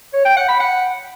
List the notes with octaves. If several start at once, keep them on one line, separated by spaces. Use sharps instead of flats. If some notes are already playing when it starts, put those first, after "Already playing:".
C#5
G5
F#5
B5
F#5